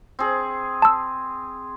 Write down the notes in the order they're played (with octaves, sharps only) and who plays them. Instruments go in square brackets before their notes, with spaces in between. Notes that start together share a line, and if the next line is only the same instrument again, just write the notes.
[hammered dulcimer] C4 G#4
[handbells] A5 E6